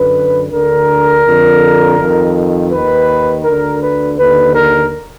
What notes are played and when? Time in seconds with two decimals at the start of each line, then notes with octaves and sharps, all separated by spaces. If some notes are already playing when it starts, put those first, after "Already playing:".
Already playing: F#2 D3 B4
0.50 D2 D3 A#4
1.24 F2 D3
1.97 F2 D#3
2.71 D#2 D#3 B4
3.44 D2 D3 A#4
3.82 B4
4.17 D#2 D3 B4
4.54 A#4